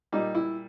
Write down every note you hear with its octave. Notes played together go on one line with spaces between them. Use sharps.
A#2 G3 D#4
E4